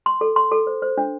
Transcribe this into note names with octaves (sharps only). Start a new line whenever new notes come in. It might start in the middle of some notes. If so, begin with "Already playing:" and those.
C6
A4
C6
A4
C5
C5
D4